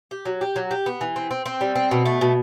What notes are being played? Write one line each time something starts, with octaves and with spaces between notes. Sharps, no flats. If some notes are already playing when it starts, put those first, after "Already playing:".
G4
F#3
G4
F#3
G4
B3
E3
C4
C4
C4
G3
C4
B2
A3
B2